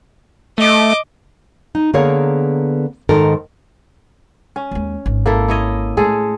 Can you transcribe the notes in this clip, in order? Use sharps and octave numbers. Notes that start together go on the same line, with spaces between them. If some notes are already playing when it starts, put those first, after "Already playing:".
A3 D#5 D6
D#4
D3 A#3 B3 G#4 A#4 C#5
G#2 D#3 A4 A#4
C#4
D#2 G#3
G#1
A#3 E4 A4
E4 C#5 D#5
A2 G#3 G#4 A4